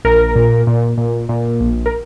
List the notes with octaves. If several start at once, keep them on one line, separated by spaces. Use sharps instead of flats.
A#1 A#4
A#2
A#2
A#2
A#2
A#1
A#4